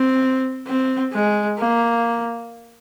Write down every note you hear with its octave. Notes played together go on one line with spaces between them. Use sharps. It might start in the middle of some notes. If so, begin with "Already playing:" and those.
Already playing: C4
C4
G#3
A#3